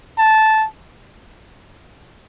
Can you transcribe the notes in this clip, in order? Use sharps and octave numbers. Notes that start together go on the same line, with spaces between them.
A5